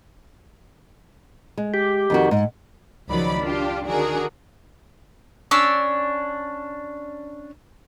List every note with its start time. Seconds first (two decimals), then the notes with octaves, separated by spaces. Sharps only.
1.57 G#3
1.74 G4
2.10 F2 D#3 F#4
2.31 G#2
3.10 C#2 D#3 F3 F#3 D5 B5
3.42 D4 F4 G4
3.86 D3 D#3 D4 F#4 G#4 A#4
5.51 C#4 D4 D6 E6